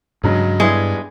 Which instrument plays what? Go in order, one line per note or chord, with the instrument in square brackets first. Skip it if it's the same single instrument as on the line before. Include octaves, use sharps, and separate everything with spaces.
[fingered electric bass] G2 D4 [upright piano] C#3 F#3 G#3
[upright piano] G3 B3 E4 [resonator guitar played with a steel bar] G#3